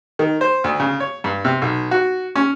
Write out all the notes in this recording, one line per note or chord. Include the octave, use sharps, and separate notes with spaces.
D#3
C5
D2
C#3
C#5
G2
C3
B1
F#4
C#4